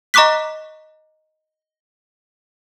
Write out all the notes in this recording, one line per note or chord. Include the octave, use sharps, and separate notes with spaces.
D#5 A#5 C#6 D6 F#6 B6